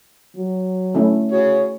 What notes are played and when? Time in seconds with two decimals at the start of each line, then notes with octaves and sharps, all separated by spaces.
0.36 F#3
0.94 A3 C#4 E4
1.32 F#4 G#4 C#5